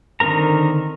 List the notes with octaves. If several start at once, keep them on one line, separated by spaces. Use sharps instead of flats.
D3 D#3 C4 A#4 A#5